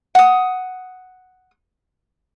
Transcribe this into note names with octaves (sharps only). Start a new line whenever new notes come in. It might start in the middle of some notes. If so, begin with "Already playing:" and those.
F#5 D#6